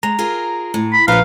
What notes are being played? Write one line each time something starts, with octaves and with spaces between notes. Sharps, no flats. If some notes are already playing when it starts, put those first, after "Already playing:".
G#3 A#5
F4 G#4 A#4
A2
B5
A#1 F4 B4 C#5 F5 A#5